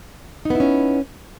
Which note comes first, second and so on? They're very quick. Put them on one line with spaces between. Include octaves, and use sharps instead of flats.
D#4 B3 E4 C#4